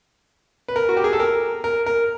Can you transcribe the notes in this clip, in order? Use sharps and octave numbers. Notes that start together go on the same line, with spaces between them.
B4
A#4
F#4
G4
G#4
A4
A#4
A#4
A#4